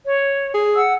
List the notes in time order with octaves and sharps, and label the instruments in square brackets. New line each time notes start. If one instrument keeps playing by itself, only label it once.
[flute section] C#5
[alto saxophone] G#4
[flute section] F#5 E6